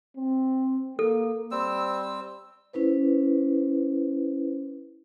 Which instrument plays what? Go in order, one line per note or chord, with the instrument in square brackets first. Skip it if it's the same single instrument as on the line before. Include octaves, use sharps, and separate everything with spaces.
[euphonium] C4
[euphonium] A#3 [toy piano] A4
[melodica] G3 C4 E6
[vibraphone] C#4 E4 B4 C5